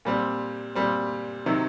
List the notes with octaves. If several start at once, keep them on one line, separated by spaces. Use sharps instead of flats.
A#2 G3 C4
A#2 G3 C4
C3 D#3 F#3